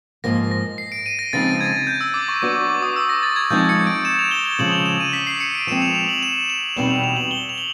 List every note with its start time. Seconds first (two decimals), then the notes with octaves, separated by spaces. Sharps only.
0.24 G#2 F3 A#3 A#6
0.51 A#6
0.78 C7
0.92 D7
1.06 D#7
1.19 A#6
1.33 C#3 F3 G#3 C4 D#4 A6
1.61 G#6
1.87 G6
2.01 E6
2.14 D6
2.28 C#6
2.42 F#3 B3 D4 F#4 D6
2.56 D6
2.69 D6
2.82 D#6
2.96 E6
3.09 A#6
3.23 A6
3.36 G#6
3.50 F3 G#3 C4 D#4 G6
3.69 C#7
3.87 D7
4.05 E7
4.19 F7
4.31 G7
4.46 G7
4.59 C#3 F3 G#3 C#4 F#7
4.72 F7
4.86 E7
5.00 D#7
5.13 B6
5.27 C7
5.40 C#7
5.55 D7
5.67 F3 G#3 C4 E7
5.82 F7
5.95 F7
6.09 F#7
6.23 E7
6.50 F7
6.76 E2 B2 G3 C4 D#4 F#7
6.91 F7
7.04 F7
7.17 F#7
7.31 G7
7.49 F7
7.58 F#7